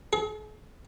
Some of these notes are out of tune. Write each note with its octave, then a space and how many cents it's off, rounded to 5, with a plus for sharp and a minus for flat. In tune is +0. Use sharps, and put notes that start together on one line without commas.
G#4 +45